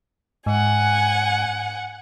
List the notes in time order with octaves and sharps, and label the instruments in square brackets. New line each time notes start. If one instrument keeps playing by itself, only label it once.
[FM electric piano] G#2 [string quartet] F#5 G#5